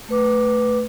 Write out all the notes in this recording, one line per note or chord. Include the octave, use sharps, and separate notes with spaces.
A3 B4 D6